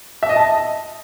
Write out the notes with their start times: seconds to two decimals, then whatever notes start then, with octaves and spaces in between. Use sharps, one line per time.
0.23 E5
0.29 D#5
0.36 A5